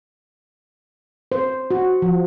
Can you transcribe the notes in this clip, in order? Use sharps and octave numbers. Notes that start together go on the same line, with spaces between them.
C5
F#4
F3